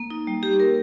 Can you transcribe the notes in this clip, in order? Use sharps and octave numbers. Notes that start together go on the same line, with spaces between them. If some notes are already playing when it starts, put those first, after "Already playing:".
Already playing: A#3
D#4
G3
G4
A#4